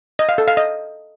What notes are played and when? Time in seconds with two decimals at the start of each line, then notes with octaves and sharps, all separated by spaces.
0.19 D#5
0.29 F5
0.38 A4
0.48 F5
0.57 D#5